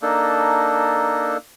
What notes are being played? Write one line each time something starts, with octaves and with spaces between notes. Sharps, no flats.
A#3 D4 D#4 A4